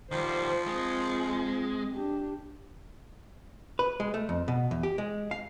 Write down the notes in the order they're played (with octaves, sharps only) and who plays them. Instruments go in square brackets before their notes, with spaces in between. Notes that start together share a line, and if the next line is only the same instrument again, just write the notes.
[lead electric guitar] D#3 G3 [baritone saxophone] F3 [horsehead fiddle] C5
[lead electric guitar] G#3 [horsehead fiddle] C4
[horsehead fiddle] D4 G4
[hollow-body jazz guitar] B4
G#3
A3
F2
B2
E2
G4
G#3
F5